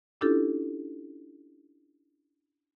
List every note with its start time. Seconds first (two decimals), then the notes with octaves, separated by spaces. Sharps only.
0.21 C#4 D4 E4 F4 G4 A4